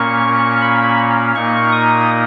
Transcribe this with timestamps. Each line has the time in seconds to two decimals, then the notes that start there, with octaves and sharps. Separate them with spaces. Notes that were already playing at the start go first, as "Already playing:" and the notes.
Already playing: A#2 A#3 C#4 C#6
0.61 B5
1.35 A#2 A#3 D#4 C#6
1.72 D#6